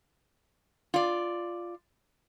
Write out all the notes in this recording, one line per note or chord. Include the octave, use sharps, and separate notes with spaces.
F4 D5